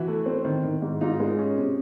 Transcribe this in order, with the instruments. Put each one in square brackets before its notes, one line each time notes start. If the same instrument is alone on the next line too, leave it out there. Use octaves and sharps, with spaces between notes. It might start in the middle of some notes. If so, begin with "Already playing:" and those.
Already playing: [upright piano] E3 [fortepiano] E4 F#4
[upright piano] A3
C4
D#3
D#3
G#2
[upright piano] G#2 [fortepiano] D#4 F4
[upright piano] G#3
C#4
C3